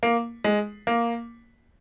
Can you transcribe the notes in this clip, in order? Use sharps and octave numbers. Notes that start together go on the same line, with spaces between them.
A#3
G#3
A#3